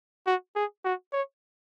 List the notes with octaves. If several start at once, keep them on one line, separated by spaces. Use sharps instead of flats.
F#4
G#4
F#4
C#5